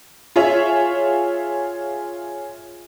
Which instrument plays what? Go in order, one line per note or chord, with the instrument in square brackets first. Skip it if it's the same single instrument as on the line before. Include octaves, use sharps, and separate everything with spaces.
[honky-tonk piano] F4 G#4 C#5 E5